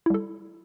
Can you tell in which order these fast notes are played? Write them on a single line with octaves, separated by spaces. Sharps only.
E4 G3 A4